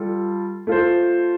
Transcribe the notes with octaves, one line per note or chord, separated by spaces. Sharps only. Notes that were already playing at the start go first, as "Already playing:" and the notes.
Already playing: G3 F4 A4
A3 F4 C5